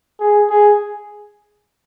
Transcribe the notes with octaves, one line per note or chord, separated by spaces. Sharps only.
G#4
G#4